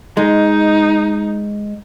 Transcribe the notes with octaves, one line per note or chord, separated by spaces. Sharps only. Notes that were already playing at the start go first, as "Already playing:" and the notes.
G#3 D#4